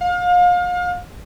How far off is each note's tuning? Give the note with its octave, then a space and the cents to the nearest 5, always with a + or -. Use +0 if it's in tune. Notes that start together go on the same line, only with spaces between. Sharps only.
F5 +35